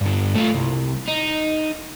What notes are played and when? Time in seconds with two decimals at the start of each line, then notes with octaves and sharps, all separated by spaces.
0.01 G2 D3
0.35 A3 F4
0.56 C2
1.08 D#4